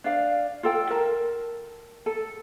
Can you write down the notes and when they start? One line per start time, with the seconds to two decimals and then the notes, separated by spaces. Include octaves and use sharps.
0.04 D4 D5 F5
0.63 F4 A4 G5
0.90 A#4 A5
2.06 A4